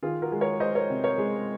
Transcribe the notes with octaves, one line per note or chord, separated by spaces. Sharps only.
D#3 F4 G#4
F#4 A#4
G#3
A#4 C#5
G#3 C5 D#5
A#4 C#5
C3
A#4 C#5
G#3